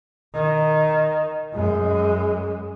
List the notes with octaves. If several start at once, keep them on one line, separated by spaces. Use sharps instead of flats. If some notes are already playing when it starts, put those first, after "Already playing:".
D#3
F#2 G#3